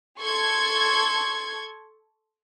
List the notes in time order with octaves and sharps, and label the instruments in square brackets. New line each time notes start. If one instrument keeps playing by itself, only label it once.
[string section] A4 C6 C#6 G#6